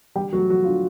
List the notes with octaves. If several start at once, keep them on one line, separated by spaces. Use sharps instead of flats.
D3 G3 G4
F#3 A3 F#4
F3 F#4
D3 F4